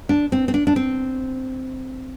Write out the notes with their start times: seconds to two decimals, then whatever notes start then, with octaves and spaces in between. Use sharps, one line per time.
0.09 D4
0.32 C4
0.48 C4
0.54 D4
0.67 D4
0.76 C4